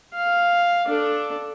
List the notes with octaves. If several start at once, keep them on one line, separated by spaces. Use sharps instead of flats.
F5
D4 A4